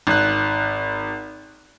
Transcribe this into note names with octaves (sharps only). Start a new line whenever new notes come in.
G#1 F#6